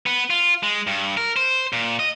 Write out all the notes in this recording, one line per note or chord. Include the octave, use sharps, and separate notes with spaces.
B3
F4
G#3
G2
A#4
C5
A#2
D#5